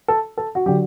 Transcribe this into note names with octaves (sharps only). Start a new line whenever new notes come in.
A4
A4
F#4
D3 F#3 G4